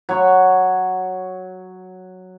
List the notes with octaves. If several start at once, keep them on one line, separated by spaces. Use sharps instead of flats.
F#3 C#5 C#6